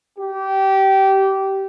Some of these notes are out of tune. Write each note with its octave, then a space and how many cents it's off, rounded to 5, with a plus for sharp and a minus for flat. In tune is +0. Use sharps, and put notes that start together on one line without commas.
G4 -20